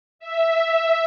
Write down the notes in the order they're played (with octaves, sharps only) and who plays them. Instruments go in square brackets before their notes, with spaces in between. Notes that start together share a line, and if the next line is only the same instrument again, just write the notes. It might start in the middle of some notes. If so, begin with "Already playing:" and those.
[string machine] E5